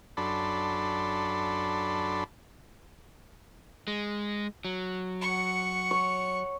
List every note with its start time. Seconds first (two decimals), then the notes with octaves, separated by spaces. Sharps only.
0.17 F#2 D4 A4 B5 C6
3.88 G#3
4.65 F#3
5.21 F#5 C#6
5.91 C#5